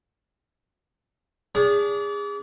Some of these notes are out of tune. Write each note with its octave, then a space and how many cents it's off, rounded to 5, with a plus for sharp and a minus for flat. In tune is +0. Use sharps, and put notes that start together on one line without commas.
D4 -35 G#4 -25